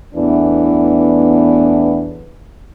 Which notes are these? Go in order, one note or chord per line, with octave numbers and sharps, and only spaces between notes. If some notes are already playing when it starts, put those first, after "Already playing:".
E2 A2 E3 B3 D4